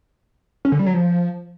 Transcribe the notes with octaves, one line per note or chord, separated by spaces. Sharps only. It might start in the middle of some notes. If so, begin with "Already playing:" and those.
C#4
D3
G3
F#3
F3